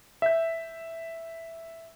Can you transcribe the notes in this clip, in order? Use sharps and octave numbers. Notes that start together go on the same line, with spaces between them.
E5 G6